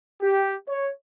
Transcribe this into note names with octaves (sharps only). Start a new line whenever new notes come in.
G4
C#5